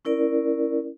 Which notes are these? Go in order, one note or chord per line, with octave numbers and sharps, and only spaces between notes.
C#4 E4 A#4 D5